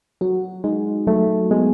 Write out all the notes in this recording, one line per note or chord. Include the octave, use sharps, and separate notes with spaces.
F#3 F#4
G#3 D#4
F#3 A3
G#3 B3